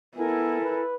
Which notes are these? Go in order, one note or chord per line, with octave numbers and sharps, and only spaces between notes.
B3 E4 A4 A#4 G#5
B4